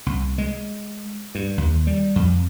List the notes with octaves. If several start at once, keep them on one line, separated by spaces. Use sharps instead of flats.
C2
G#3
G2
D#2
G3
F2